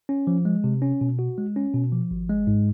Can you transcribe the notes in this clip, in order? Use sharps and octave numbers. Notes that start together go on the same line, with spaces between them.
C#4
F3
G#3
C3
C#4
B2
F#4
G#3
C#4
B2
F3
G#1
G#3
G#2